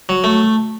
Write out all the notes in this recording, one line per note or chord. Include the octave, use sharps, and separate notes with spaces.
F#3
A3